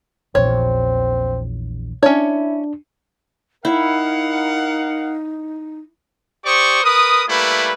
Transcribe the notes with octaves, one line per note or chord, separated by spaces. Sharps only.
A#1 E2 C4 C#5
C#4 D4 E4 C#5
D#4 E4 A#4 F5 F#5
G4 C5 D5 C#6 D#6
A#4 B4 D#6
G3 A3 A#3 E4 B4